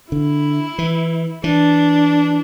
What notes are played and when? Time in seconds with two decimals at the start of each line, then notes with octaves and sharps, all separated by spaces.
0.11 D3 E4
0.78 E3
1.44 E3 D4